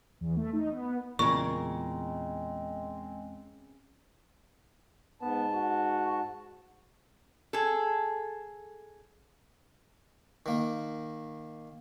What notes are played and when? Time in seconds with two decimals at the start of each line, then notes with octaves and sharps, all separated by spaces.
0.21 E2
0.37 A3
0.53 D#4
0.72 B3
1.19 E2 A#2 C#3 G#3 C4 A#4 C#6
5.21 G#2 B3 A5
5.54 F#4
7.53 G#4 A4
10.46 D#3 A#3